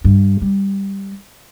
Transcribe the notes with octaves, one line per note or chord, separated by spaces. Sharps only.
G2
G3